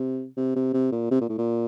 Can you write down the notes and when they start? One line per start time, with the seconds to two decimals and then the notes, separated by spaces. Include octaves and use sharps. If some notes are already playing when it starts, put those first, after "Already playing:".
Already playing: C3
0.37 C3
0.56 C3
0.73 C3
0.92 A#2
1.11 C3
1.21 A#2
1.29 A2
1.38 A#2